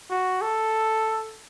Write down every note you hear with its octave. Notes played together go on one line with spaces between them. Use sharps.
F#4
A4